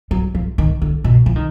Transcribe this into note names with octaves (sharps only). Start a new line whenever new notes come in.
F#3
F3
D#3
D3
B2
F3
D#3